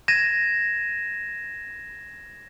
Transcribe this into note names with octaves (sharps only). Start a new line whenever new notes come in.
G#6 A#6 D#7 E7